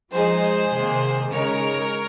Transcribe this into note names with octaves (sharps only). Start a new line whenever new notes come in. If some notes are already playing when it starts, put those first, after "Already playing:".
F3 G#3 D#4 G#4 C5
C3 D#3 A#3
C#3 G#3 D#4 A#4 C#5